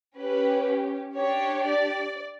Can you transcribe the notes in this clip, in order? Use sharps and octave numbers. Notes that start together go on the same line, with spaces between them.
C#4 G4 B4
D4 G4 C#5
D5